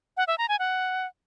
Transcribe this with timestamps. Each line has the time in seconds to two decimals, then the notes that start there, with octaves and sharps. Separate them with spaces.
0.17 F#5
0.28 E5
0.38 A#5
0.49 G#5
0.59 F#5